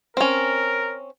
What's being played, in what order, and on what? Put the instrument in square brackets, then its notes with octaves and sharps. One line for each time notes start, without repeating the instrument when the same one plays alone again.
[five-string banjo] C4 C#4 [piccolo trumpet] A#4